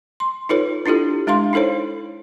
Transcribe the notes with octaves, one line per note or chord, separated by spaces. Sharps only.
C6
D#4 F4 A4 B4 C#5
D4 E4 F4 G4 A4
G#3 D4 F5 C6
D#4 E4 A4 C5 C#5